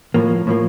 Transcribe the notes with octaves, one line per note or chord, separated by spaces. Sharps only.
A2 F3 A#3
A2 F3 A#3